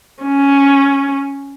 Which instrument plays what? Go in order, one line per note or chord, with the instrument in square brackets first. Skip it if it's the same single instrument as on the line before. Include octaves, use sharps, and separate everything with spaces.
[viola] C#4